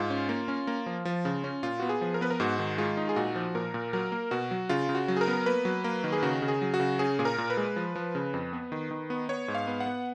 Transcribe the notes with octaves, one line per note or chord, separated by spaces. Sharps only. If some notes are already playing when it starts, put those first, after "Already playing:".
Already playing: G#2 F4
C#4
A#3
C#4
A#3
F3
F3
C#3
C#4
A#2 F4
B3 F#4
G#4
F3
A#4
B3 B4
A#4
G#2 F#4
D#3
G#3 F4
D#4
G#4
A#2 F#4
F3
A#2 A#4
A#2
F#3 A#4
A#3
B2 F#4
F#3
C#3 F4
C#3
F#4
F#3
G#4
A#4
B3
A#3 B4
F#3
A#3
D#3
G#4
C#3 F#4
C#3
G#4
F#3
F#4
C#3
C#4 G#4
A#2 G#4
A#4
A#2
B4
G#3
F3
F3
C#3
F2
B3
D#3
D#3
B3
B3 C#5
G#2
F5
B3
F#5
B3